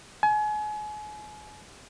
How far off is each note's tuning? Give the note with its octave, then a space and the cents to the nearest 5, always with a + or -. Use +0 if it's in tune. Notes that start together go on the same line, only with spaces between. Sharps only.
G#5 +35